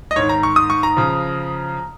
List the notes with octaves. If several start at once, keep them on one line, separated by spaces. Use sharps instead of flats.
D#5
G#2 D#3 C#5
A#5
C#6
D#6
C#6
A#5
C#3 F3